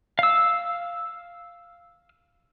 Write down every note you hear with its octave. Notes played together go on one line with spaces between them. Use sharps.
F5 E6